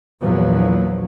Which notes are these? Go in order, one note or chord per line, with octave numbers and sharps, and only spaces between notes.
A#1 E2 A#2 F3 F#3